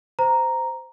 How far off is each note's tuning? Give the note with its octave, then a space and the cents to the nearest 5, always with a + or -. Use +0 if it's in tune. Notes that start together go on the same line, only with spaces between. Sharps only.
C5 -20 A#5 +0